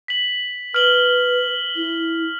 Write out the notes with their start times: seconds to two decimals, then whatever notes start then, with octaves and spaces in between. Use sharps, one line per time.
0.08 B6 F#7
0.74 B4 F6 F#7 G7
1.76 E4